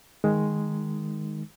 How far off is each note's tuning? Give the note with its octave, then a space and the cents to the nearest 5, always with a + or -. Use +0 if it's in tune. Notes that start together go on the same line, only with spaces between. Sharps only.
D#3 +0 G#3 +0 D#4 +0